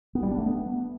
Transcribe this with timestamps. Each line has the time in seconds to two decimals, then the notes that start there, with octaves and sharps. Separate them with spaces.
0.15 B3
0.23 G3
0.31 D4
0.38 A3
0.46 B3